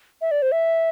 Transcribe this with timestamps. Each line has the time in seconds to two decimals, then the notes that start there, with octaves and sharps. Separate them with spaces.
0.21 E5
0.31 D5
0.42 C5
0.52 E5